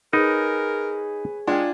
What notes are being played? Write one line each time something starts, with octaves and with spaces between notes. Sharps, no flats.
D#4 G#4 A#4 B4 C#5
G#3 D4 F4 G5 G#5